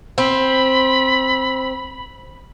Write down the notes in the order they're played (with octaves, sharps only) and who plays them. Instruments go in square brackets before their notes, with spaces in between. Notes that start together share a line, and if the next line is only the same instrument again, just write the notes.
[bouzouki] C4 [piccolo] B5